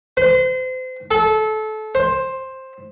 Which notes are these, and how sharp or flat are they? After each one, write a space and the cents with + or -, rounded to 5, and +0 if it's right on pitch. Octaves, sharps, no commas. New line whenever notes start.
C5 -35
A4 -25
C5 +10